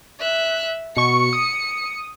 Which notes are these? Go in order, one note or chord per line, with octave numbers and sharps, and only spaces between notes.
E5 F#6
B2 C#6 C#7
D#6